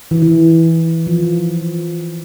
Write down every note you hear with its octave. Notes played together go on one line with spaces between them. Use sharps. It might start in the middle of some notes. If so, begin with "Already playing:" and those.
E3
E3
F3